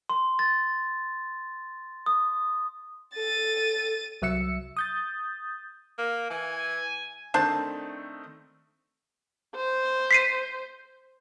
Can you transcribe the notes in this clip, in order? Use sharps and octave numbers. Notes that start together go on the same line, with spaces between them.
C6
A6
D#6
A4 A6 D#7
C2 F#3 E5 E6 C#7
D#6 G6 A6
A#3
E3 G#5
D#3 A3 C4 D4 C5 A5
C5
B6 C7 D#7